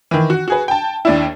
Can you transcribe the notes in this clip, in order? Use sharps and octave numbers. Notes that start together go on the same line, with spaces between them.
D#3 E3
F#4
F#4 G#4 B4
G5 A5
D#2 D4 E4